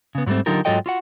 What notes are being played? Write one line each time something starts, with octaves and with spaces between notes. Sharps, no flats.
C#3 B3
G#2 F#3 G3 A3 C4
D3 F#3 D#4 F4 G4 A#4
G#2 F#3 F4 A4 D#5 G5
F4 F#4 F#5